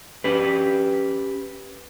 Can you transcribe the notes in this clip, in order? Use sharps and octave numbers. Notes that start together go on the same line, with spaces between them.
C#4 G4 B4